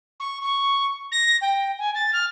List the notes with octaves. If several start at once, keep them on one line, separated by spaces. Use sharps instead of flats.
C#6
C#6
A#6
G5
G#5
A6
F6